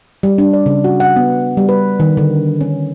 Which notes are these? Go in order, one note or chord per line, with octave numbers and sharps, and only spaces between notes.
G3
D4
D5
C#3
F#4
F#5
B3
G3
B4
D#3
D3
C#4